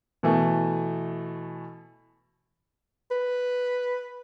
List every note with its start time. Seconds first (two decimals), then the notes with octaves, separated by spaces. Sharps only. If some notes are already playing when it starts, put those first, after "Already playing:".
0.23 B2 E3 A3
3.11 B4